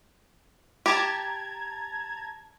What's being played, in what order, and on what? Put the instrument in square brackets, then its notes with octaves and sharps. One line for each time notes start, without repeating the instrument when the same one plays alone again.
[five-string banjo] G4 [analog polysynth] A5 A#5 G#6